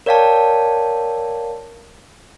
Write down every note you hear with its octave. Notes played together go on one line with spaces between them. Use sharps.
A#4 C#5 D5 F5 G5 A5